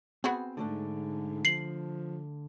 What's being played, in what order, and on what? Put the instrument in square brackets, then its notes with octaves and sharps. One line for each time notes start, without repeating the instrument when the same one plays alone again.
[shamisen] B3 F#4 G#4 [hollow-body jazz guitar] C4 B5
[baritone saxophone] G#2 [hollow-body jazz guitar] D3 A3 D4
[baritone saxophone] F3 [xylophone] C7 F#7